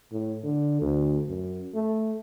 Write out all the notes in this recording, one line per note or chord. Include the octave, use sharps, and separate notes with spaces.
A2
D3
D2
F#2
A3